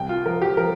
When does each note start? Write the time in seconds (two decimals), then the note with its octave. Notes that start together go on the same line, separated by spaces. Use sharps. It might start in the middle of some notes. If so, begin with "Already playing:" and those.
Already playing: C2 G5
0.09 F4
0.26 F3 A#4
0.42 G4
0.57 F3 A#4